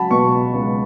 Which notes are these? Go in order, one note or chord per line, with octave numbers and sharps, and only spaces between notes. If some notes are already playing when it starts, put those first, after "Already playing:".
Already playing: C#2 F#3 F#5 A5 B5
B2 C#6
C#2